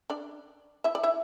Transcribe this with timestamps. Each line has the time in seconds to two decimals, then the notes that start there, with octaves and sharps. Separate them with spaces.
0.10 D4 D5
0.84 E4 E5
0.95 D5
1.03 E4 E5